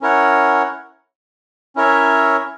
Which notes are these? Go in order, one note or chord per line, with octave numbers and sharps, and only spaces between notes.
C#4 E4 A#4 C#5 F#5
C#4 E4 A#4 C#5 E5